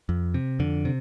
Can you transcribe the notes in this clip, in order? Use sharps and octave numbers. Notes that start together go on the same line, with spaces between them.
F2
C3
F2 D3
C3